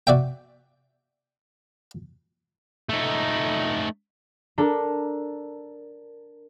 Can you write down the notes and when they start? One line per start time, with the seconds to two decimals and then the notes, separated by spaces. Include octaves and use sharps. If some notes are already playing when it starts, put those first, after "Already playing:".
0.07 F#4 D5 E5 G5
2.89 A3 D#4
4.58 D4 A4 A#4